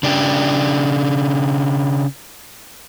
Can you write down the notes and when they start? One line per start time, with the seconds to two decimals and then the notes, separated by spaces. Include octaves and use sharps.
0.03 C#3 D4 G4